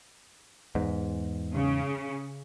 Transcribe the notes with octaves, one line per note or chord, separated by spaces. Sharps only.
E2 G#2
C#3